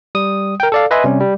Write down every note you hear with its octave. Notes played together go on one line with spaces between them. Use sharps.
G3 D#6
A#4 G5
A4 D5 F5
B4 D#5 E5 G#5 C6
C3 G3 C#4
G3